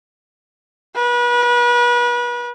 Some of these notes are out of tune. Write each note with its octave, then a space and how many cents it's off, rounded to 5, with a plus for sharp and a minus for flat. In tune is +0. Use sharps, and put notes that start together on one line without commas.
B4 -35